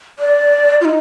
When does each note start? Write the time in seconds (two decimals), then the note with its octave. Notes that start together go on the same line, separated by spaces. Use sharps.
0.19 D5
0.81 F4
0.85 D#4